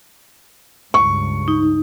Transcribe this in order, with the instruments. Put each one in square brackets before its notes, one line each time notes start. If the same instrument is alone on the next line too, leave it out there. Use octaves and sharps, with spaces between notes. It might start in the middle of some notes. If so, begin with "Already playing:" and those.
[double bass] C#2 G2 [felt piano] C#6
[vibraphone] D#4